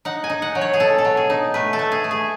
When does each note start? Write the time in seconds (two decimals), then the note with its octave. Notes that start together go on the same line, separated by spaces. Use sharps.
0.05 D#4 F#5
0.24 G#5
0.30 D#4
0.42 F#5
0.55 F#3
0.61 C#5
0.73 G#4
0.80 B2 A4
0.98 A4
1.05 F#3
1.17 G#4
1.30 D#4
1.54 A3 B4
1.73 A4
1.79 A3
1.92 G#4
2.04 A3
2.11 G#4